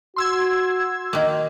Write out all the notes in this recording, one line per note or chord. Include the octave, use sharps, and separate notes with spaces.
F#4 C6 E6 G#6
D#3 A#3